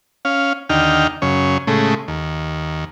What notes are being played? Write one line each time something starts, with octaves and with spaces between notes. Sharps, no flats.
C#4 F5
D#2 D3 D#4 G5 F6
F#2 C#3 C#5
A2 C#3 G#3 A3
D#2